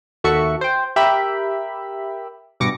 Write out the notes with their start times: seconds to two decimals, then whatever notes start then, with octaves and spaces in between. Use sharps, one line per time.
0.24 D#2 F#4 A4 E5 C#6 C#7
0.61 C5 G5
0.96 G4 A#4 E5 G5 B5
2.60 G2 B2 D6 A#6 C#7